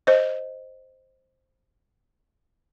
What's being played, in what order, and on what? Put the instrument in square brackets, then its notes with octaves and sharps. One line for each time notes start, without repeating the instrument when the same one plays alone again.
[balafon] C5 D#5